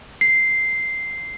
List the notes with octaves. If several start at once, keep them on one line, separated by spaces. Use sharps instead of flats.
C7